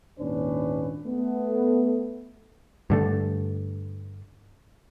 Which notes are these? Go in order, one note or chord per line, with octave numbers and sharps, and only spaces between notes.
G#1 D#2 A#2 C#4 D4 B4
A3 B3
G2 D3 A3